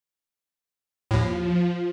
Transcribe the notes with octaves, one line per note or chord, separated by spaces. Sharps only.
D#2 A2 F3